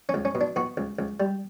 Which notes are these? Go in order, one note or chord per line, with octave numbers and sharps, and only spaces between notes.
C#4
C#2
C#4
B2
D4
B2 F#4
C#2
C#2
G3